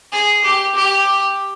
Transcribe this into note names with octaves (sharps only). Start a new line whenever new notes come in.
G#4
G4
G4